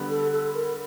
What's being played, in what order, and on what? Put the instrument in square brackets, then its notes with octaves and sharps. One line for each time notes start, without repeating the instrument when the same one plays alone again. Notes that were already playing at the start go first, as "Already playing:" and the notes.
Already playing: [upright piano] D3 G3 B3
[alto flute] A4
A4
A#4